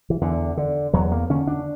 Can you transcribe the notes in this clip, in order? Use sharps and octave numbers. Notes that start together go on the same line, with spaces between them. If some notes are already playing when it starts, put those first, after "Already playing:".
E3
E2 D3
D3
E2 F#3
A#3
D3 C#4
D4